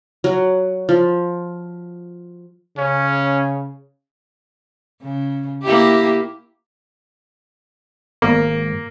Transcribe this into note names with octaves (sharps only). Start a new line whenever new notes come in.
F#3
F3
C#3 C#4
C#3
A#3 E4 G4
G#1 A#3